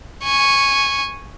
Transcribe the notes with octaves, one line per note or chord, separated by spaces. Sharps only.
G#5 C#6